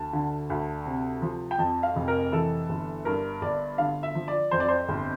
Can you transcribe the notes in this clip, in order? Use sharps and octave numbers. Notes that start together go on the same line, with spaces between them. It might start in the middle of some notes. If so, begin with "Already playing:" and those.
Already playing: D2 A5
D3
D2
C3
F3
G5
F2 A5
F5
F1
A#4
E3 A4
G1
G2 A#4
G1 D5
D3 F5
E5
F3
D5
F2 C5
D5
C5
G1